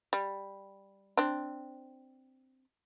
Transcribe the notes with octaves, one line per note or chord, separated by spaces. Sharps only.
G3
C4 D4